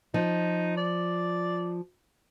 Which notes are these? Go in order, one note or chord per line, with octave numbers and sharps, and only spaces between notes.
F3 D#4
D5